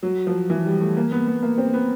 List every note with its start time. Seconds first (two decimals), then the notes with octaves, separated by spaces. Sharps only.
0.03 F#3
0.27 F3
0.50 E3
0.65 G3
0.81 A3
0.97 A#3
1.12 B3
1.27 B3
1.42 A#3
1.58 C4
1.73 B3